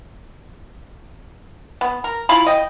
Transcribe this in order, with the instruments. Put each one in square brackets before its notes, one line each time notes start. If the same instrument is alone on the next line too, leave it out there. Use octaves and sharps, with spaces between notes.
[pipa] B3
A#4
E4 F4 F5 B5
D#5 G5